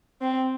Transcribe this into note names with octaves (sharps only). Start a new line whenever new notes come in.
C4